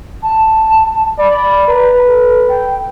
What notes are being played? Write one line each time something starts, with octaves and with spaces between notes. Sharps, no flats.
A5
D5 B5
B4 A#5
A4
G5